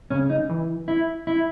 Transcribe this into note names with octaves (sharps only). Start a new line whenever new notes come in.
C#3 C#4
D#4
E3
E4
E4